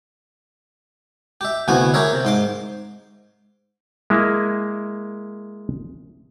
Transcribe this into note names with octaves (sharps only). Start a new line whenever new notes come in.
G4 E5
D2 C3 E3 B3 F#4 G#5
G4 G#4 A#4 C#5 E5
C3
G#2 C6 D6
G#3 A#3 E4